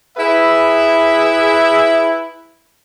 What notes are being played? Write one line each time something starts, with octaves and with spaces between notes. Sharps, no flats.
E4 G#4 B4 E5